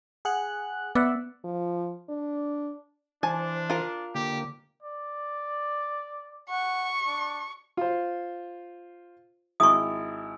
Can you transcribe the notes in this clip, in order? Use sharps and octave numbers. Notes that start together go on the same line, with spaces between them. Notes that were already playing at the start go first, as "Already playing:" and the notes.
G#4 F#5 F#6
B3 D5 E5 F#5
F3
D4
E3 D4 C5 G#5 A5
F4 A#4
D3 A#3 G4
D5
F#5 C#6
D4
F4 C5
G#1 E4 C#6 D#6